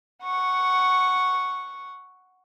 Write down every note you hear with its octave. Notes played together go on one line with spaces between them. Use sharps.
F#5 C#6